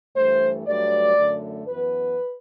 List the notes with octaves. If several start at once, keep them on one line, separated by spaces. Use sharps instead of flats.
G2 E3 A3 C5
G2 F#3 A3 D5
F#2 D3 A3
F#2 E3 B3 B4